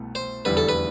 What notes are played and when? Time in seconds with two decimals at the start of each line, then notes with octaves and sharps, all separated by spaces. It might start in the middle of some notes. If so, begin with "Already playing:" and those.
Already playing: C2 B2 A3
0.15 C5
0.45 F1 E2 D3 G3 B4
0.57 A4
0.69 B4